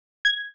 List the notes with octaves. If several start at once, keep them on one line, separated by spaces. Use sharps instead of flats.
G#6